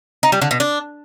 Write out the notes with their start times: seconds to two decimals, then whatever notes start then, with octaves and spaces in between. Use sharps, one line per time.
0.23 D#4
0.32 G3
0.42 D3
0.51 B2
0.60 D4